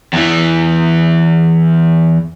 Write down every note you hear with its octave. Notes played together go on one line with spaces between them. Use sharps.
E2 E3